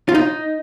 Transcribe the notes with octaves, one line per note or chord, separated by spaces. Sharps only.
F4
D#4